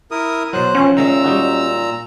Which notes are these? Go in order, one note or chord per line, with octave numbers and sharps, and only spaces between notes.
E4 A#4 D#6
B2 F#3 C5 F#6
F3 C#4 F#5
A#2 D#3 G#3 E5 A#5 E6
G3 D#4 F#4